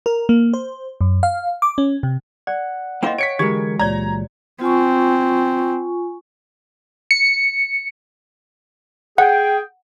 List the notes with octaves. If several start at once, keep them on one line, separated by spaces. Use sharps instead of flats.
A#4
A#3
C5
F#2
F5
D6
C#4
C3
D5 F#5
A#3 E4 C5 D#5 F5 G5
C#5 B6 C#7 D7
D3 E3 F#3 G#3 G4 G#4 A#4 G#6
C#2 A#2 C#5 D5 A#5 G#6
C4 F4 G#5 C#6
C#7
G#4 F#5 G5